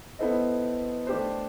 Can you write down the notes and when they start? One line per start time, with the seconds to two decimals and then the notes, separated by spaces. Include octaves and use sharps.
0.19 B3 E4 A4 C5 D#5
1.07 A3 D4 G4 C5